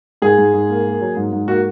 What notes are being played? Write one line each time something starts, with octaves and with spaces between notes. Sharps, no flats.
G#2 G#4
G#2
G#2
A#3
A#3
F#3
G#2
G#2
A#3 F#4